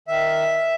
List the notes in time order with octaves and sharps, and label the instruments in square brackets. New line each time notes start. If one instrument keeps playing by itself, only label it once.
[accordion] D#3 E5